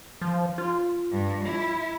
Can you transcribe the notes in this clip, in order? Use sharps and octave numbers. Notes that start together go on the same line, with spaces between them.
F3
F4
G2
E4